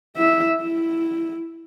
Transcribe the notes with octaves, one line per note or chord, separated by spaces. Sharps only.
E4 E5
E4